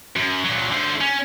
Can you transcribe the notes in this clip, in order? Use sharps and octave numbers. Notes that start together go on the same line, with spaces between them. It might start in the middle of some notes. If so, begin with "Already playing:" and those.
F#2
A#2 F#3
D3 C5
C#4